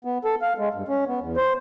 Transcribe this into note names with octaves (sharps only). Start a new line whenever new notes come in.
B3
A4
F5
G#3
G2
C#4
B3
E2
C5